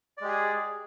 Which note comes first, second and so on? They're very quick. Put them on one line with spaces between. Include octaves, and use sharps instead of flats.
D5 G#3 G4 G#4